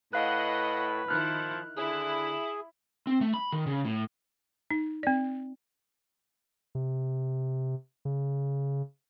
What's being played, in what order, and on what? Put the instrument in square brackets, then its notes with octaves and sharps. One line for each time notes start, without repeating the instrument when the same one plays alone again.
[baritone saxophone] A2 [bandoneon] B4 [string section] D#5 F#5 [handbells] F5 F#6
[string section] D#3 E4 [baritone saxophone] F3 [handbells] F6 F#6
[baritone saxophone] D3 [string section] E4 [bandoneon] G#4
[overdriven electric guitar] C4
A3
B5
D#3
C#3
A2
[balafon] D#4
C4 D5
[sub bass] C3
C#3